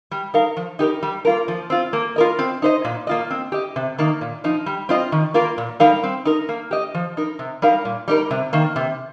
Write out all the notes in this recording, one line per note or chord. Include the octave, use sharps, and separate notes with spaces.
G3
D#4 A#4 F5
F3
D#4 G4 A#4
G3
A#3 F4 A#4
F3
C4 F4
A#3
F4 A#4 D#5
C4
D#4 C5 D#5
A#2
A#3 F4 D#5
C4
G4 D#5
C3
D#3 A#3 D#4
A#2
F3 D#4
G3
C4 F4 D#5
D#3
A#3 F4 A#4
A#2
G3 D#4 A#4 F5
C4
D#4 A#4
A#3
G4 D#5
F3
D#4 A#4
C3
G3 D#4 A#4 F5
A#2
G3 D#4 A#4
C3
D#3 A#3
C3